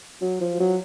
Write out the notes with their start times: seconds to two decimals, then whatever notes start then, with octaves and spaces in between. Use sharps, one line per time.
0.21 F#3
0.41 F3
0.60 F#3